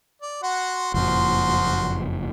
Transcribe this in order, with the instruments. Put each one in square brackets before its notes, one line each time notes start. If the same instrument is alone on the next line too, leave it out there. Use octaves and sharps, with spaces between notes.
[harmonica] D5
F#4 F#5 C6
[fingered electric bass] F#1 F2 A#2 [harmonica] F3 F#4 C6